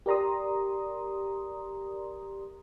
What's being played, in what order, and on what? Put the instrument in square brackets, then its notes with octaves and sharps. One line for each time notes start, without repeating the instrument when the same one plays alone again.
[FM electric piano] G4 A#4 D5 A#5 C6 D#6